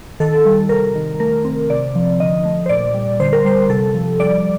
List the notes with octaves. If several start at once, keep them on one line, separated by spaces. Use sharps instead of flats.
D#3 A4
G3
C3 A#4
D#3
A3 A#4
C4
C3 D5
F3
D3 D#5
A3
C5
A#2 D5
G3
D3 C5
A#4
G3 C5
C3 A4
F3
G3 D5